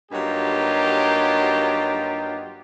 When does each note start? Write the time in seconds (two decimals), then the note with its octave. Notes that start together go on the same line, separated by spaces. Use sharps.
0.12 G2 F#3 A#3 D#4 F4 G4